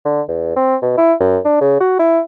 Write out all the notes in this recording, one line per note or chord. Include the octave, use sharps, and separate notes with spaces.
D3
E2
C4
B2
E4
F#2
D4
C#3
F#4
E4